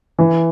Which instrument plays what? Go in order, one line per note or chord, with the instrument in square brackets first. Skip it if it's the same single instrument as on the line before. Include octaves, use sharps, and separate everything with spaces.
[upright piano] E3